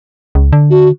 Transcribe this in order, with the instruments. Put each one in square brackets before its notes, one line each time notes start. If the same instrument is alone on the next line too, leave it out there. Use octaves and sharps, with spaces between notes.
[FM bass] C#2
D3
[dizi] F#4